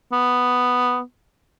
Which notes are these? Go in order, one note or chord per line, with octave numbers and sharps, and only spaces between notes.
B3